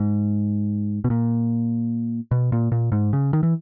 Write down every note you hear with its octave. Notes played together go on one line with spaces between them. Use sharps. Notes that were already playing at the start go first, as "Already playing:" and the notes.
Already playing: G#2
B2
A#2
B2
A#2
A#2
G#2
C#3
D#3
E3